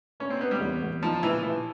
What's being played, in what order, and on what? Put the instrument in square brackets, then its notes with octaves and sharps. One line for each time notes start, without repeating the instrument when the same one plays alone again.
[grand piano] A#3 [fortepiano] C#4
[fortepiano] C4
[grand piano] A#3 [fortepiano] B3
[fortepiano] G3
[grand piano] E2
E2
[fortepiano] F3 [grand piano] D#4
[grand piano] A#2 [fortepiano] E3
[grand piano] A#2 [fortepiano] E3